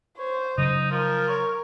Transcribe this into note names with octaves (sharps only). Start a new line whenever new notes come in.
C5 C#5
C#3 F#3 D#4
F3 A#4
C#5